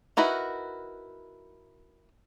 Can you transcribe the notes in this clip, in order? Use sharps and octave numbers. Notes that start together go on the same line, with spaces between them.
D#4 E4 F#4 A#4 B4